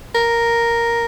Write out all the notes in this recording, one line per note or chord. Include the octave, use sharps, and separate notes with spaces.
A#4